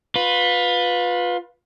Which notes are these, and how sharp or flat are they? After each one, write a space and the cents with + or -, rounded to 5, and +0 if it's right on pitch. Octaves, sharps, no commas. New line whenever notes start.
F4 +25 B4 +0